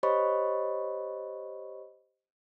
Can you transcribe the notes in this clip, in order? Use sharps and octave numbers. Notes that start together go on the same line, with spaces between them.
G4 C5 C#5 D#5 B5 C#6